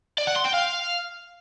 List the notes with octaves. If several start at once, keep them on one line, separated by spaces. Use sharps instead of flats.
D5
F#5
C6
G5
F5